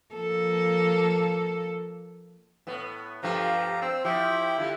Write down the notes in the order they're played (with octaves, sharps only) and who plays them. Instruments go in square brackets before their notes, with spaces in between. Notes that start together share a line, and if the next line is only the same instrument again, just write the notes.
[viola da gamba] F3 A#3 A4
[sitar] A2 B3
[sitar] G2 F3 A3 [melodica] G4 F5 A#5
[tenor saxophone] C4 [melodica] C5 E6
[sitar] F3 [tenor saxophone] E4 [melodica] G4 G5
[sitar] D3 G3 [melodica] F4